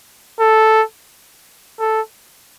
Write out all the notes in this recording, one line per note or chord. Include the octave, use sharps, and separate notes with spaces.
A4
A4